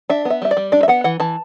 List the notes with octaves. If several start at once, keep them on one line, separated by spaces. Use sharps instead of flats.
D4 E5
B3
E5
G3 E5
D5
G3
D4 D5
E5
B3 F#5
E3 F#5
E3 A5